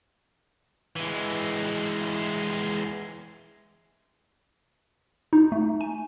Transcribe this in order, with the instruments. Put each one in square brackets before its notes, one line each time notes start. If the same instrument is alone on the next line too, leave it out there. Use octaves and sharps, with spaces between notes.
[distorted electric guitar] E3 G#3
[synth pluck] D#4
A3
G#5